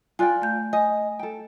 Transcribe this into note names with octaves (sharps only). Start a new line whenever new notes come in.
F4 D5 G5 G#5 F#6
A3 G6
D#5 G#5
A4 G5